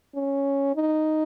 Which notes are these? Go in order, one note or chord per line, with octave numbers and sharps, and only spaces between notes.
C#4
D#4